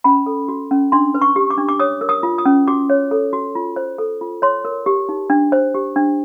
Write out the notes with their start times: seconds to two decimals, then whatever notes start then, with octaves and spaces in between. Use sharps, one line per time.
0.04 C#4 B5
0.26 A4
0.48 F#4
0.71 C#4
0.92 D4 C6
1.14 B4
1.21 C#6
1.36 G4
1.50 D6
1.58 D4
1.69 D6
1.80 C#5 D#6
2.01 A#4
2.09 D#6
2.23 F4
2.38 D#6
2.46 C#4
2.68 F#4 D6
2.90 C#5
3.11 A4
3.33 F#4
3.55 F4
3.76 C5
3.98 A4
4.21 F4
4.42 C#5 C6
4.65 A#4
4.86 G4
5.09 D#4
5.30 D4
5.52 C5
5.74 G4
5.96 D4